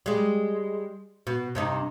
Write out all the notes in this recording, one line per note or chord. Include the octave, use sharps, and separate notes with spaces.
G3 G#3
B2
G2 C3 D#4